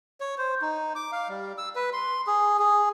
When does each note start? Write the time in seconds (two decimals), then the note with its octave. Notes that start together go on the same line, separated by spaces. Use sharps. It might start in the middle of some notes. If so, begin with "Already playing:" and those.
0.21 C#5
0.38 C5
0.62 D#4
0.95 D6
1.12 F5
1.29 G3
1.58 E6
1.76 B4
1.93 C6
2.27 G#4
2.59 G#4